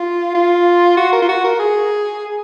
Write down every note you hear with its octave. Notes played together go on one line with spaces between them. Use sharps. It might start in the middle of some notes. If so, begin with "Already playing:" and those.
Already playing: F4
F4
F#4
A#4
F4
F#4
A#4
G#4